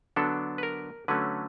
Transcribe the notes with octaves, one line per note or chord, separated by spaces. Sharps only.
D3 F#3 B3 D4 A4
B4
A#4
D3 F#3 A3 C#4 B4